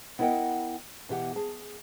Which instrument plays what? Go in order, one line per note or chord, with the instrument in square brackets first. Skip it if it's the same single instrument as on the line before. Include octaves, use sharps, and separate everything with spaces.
[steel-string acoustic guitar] B3 E4 A#4 D#5 F#5 G5
B2 E3 G4 F#5
G#4 A5